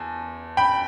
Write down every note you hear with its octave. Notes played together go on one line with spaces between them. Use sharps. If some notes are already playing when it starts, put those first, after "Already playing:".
Already playing: E2 A5
G5 B5